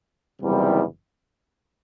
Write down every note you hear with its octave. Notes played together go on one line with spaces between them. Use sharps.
F#1 E2 C3 D#3 G3